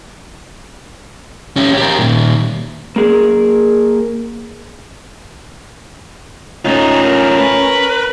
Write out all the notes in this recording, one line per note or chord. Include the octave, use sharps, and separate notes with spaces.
C#4 G4
G4 A#4
A#2 D#3
A#3 G#4 A#4
A3 C#4 D#4 F4
A#4
B4